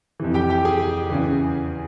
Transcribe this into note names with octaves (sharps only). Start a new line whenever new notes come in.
F2 C3 E3
G4 G5
G4 G5
G#4 G#5
E2 C#3 E3